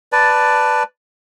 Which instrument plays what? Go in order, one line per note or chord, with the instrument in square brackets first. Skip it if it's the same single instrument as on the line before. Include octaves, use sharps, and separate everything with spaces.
[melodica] B4 D5 A5